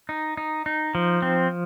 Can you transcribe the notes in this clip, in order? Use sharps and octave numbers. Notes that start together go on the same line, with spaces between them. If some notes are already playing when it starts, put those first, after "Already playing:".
D#4
D#4
D#4
F3
C4